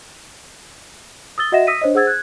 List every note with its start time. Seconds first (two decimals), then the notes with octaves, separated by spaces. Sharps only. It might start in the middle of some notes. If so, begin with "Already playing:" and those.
1.38 D#6 E6 A6 G7
1.52 F#4 D#5 E5 F#5 A#6 E7
1.67 D#6 E6 A#6 B6 D#7
1.81 D4 C5 C#5 D#5
1.94 G#4 C5 F#5 E6 G#6 A6
2.07 F#6 G#6